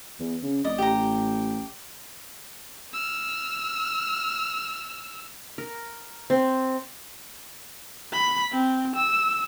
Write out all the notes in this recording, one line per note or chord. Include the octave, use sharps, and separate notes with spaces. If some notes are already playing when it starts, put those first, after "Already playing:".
E2
C#3
F1 D5 D#5
A1 G4 A#5
E6 F6
A#4
C4
B5
C4
E6